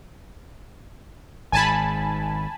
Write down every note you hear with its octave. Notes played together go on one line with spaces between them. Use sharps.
G#1 G#2 G#5 A5 B5